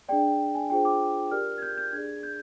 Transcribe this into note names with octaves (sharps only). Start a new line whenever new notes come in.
D4 G#4 D5 G5
G#5
D4 F4 G#4 C5 G5
D6
G4 A#4 D5 F6
G#6
G6
G6
D4 G#4 D5 G#6
G6